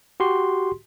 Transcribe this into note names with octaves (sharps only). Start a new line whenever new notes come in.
F#4 G4 C6